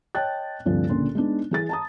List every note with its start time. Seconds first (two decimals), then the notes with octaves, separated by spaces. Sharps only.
0.15 C#5 D#5 G5 A5 F#6 A6
0.65 D2 G2 C3 F3 G3
0.89 C#2 A#2 D3 C6
1.15 G#3 B3 D4 D#4
1.51 E3 G#4 A6
1.69 A5 A#5 D#6